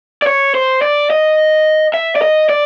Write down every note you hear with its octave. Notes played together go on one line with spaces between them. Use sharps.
D5
C#5
C5
D5
D#5
E5
D5
D#5
D5